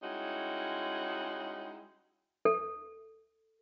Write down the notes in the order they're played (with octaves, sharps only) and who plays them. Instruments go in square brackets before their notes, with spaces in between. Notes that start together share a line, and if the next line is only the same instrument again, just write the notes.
[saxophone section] G3 G#3 C#4 D#4 E4 F#4
[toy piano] A4